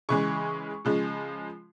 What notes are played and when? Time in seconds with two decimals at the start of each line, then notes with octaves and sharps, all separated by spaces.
0.09 C#3 E3 G#3 C#6
0.85 C#3 F3 G#3